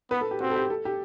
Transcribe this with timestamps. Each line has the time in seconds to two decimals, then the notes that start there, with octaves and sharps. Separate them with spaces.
0.11 B3 B4
0.21 A4
0.31 G4
0.40 C4 F#4
0.50 A4
0.56 G4
0.70 A4
0.85 G4